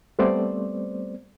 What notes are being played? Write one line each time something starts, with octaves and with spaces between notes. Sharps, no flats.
G3 A3 B3 C4 C5 D5